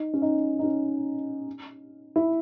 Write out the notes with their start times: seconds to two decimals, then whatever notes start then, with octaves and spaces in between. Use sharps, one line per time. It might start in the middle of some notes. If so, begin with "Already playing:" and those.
Already playing: D#4
0.14 C#4
0.22 D#4
0.59 D#4
0.63 C#4
2.16 E4